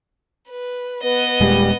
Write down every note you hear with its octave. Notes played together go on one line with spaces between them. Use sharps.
B4
B3 B4 D#5
D#1 A#2 G3 G#3